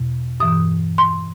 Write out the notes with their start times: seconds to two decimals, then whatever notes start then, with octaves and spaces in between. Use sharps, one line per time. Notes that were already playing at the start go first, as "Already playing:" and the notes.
Already playing: E2 B2
0.40 G2 E3 D#6
0.98 C6